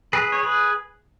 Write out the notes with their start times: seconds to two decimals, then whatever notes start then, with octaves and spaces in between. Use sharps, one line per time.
0.13 G#4 B4
0.32 C#5
0.43 G#4 B4